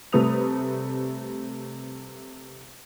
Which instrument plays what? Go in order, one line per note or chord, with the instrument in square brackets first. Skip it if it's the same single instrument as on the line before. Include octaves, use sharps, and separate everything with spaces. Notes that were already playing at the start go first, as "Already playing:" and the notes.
[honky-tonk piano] C3 G3 A3 B4 D#6 F7